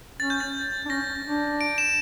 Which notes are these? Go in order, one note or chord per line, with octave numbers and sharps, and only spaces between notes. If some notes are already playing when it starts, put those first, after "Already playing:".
C#4 A6
G6
A6
D4
C#4 A#6
D4
D7
E7